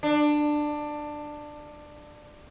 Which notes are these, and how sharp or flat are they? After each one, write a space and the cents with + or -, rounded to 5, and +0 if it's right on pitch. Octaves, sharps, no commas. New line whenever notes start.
D4 +15